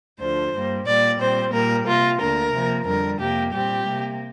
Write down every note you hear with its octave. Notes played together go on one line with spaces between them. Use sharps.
D2 D3 F3 C5
G2 G3 A#3
A#2 G3 A#3 D5
A#2 G3 C4 C5
A#2 G3 A#3 A#4
C3 A#3 F4
D2 D3 A#3 A#4
C3 F3 A#3
F2 D3 G3 A#4
F2 C3 A#3 G4
A#2 G3 C4 G4
C3 A#3